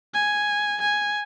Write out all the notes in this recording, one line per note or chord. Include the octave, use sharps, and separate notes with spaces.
G#5
G#5